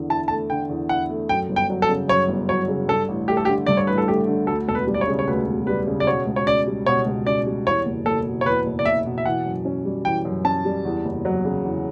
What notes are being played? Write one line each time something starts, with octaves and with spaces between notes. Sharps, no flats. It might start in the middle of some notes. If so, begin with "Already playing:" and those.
Already playing: E2 D3
E4 A5
A3 A5
D3 G5
E2
E4 F#5
A3
F#2 G5
G1
G5
F#3
A4
C#3
F#2 C#5
G1
F#3 C#5
C#3
G2 A4
A1
A3 G4
A4
G4
D3
G2 D5
C#5
A1 B4
A4
A3 G4
D3
D2 A4
E1 A4
B4
G3
D5
C#5
C#3
C#5
D2 B4
E1
G3 B4
C#3
D5
B2 C#5
C#2
C#5
C#4 D5
G3
B2 C#5
C#2
C#4 D5
G3
E2 C#5
F#1
F#1 A4
B2
C#5
E2 B4
F#1
D5
F#1 E5
B2
E5
E3 F#5
F#2
C#4
G3
E3 G5
F#2
C#4 A5
G3
E2
F#1
F#3
C#3
E2